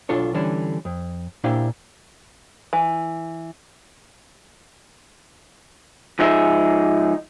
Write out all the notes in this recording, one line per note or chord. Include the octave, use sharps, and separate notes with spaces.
B1 D4 F4 A4 C#5
D3 E3 G3 C#4 D4
F2
A#2 D4 E4 G4 C5 F5
E3
G#2 F3 D#4 G#4 E5